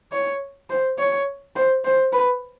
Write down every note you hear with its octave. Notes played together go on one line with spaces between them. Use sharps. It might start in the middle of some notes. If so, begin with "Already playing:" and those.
C#5
C5
C#5
C5
C5
B4